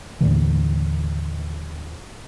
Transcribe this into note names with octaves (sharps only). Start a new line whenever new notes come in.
D#2 A2 D3 E3